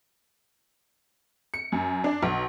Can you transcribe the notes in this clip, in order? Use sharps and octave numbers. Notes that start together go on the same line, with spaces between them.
C#7
F#2
D4
B1